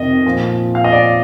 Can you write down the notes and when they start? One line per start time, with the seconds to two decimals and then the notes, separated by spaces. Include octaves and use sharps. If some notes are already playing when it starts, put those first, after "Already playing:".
Already playing: F2 C3 D#3 D#5
0.25 A#2 F3
0.75 F5
0.84 D#5
0.92 D5